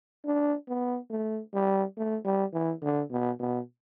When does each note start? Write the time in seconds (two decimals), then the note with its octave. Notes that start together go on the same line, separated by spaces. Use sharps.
0.25 D4
0.68 B3
1.10 A3
1.54 G3
1.97 A3
2.25 G3
2.53 E3
2.82 D3
3.11 B2
3.40 B2